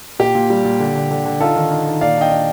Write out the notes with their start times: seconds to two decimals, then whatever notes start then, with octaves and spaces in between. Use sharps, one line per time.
0.19 A#2 G4
0.35 A#2
0.50 G3
0.65 A#2
0.80 D3
0.95 D3
1.11 D3
1.25 D3
1.40 D#4 F4 A4
1.56 D#3
1.71 D#4
1.86 D#3
2.01 A#2 D5 F5
2.17 D4 D#5 G5
2.31 D4